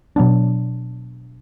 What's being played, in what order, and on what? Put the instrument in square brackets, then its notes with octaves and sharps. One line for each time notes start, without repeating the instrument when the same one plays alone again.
[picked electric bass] B2 F#3 B3 D4